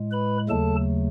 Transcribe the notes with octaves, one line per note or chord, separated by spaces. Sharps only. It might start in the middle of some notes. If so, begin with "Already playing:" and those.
Already playing: A2 G#3
B4 B5
D#2 C#3 F#3 A3 A4 A5